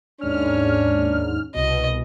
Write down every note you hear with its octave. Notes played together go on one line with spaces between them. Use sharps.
D#2 G#2 C#4 D4 F6
C2 B2 D#5